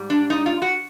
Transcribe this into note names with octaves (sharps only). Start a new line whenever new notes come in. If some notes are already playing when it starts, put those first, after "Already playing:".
Already playing: G#2 G3
D4
D#4
F4
F#4